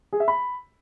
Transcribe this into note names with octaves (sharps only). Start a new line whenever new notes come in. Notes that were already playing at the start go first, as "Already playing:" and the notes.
G#4
E5
B5